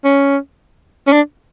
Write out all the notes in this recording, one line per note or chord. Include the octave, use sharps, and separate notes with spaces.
C#4
C#4
D4